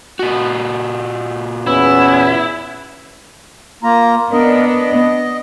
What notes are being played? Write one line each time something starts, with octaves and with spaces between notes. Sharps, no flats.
A#2 F#4
E2 B3 C#4 E4
A#3 F4 A#5
B3 D4 A#4 D#5
D#5